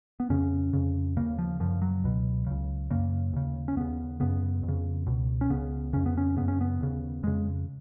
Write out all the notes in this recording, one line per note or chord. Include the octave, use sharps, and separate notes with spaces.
B3
F2 C#3 C#4
F2 C#3
D#2 C#3 A#3
F3
F#2 C#3 F3
F#3
C#2 B2
C#2 C#3
F#2 C#3 A#3
D#2 C#3
C#4
D#2 C#3 B3
F#2 C#3 B3
F2
C#3
C#2 B2
C#4
C#2 C#3 B3
F2 C#3 C#4
B3
C#4
F#2 C#3 B3
C#4
B3
D#2 C#3
F2 C#3 G#3